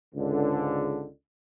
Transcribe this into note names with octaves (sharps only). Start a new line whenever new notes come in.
C#2 G#2 D3